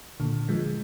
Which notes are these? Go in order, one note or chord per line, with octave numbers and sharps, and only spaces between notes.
A#2 D3
F3 G#3